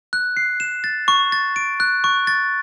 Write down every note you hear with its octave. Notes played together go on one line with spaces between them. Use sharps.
F#6
C7
E7
A6
C#6
A6
D7
F#6
C#6
A6